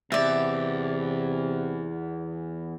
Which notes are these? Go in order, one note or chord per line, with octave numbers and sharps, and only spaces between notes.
E2 C3 D5 E5